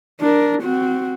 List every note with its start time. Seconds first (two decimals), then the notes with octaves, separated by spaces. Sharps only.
0.20 D4 A#4
0.62 C4 F#4